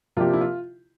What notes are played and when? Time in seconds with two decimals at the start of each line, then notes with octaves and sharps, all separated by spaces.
0.17 C3 F3 A#3 D4 F4 G4
0.33 E4
0.41 F4